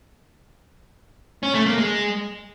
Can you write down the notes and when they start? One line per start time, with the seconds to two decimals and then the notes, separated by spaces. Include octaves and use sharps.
1.43 C#4
1.54 A3
1.66 A#3
1.78 G#3